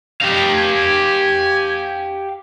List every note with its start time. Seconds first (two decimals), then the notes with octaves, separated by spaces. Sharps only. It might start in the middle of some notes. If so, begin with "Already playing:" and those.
0.21 G3 D4 D#4 G4 F5
0.55 C#4 G#5